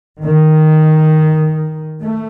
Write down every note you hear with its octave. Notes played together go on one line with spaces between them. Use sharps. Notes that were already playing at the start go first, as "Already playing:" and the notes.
D#3
A3